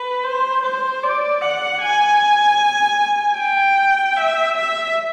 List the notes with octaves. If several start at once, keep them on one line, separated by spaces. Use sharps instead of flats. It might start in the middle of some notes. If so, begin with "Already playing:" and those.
Already playing: B4
C5
C5
D5
F#5
G#5
G5
E5
E5